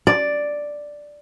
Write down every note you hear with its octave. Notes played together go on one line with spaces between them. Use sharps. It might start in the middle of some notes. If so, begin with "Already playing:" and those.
D5